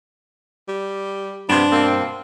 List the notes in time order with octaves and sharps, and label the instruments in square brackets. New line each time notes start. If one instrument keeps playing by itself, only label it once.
[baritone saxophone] G3
[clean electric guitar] G2 C5 [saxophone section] C3 F3 B3 [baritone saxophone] D4
[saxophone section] B2 A#3 C4